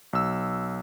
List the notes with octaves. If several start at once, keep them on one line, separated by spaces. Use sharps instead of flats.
B1 E6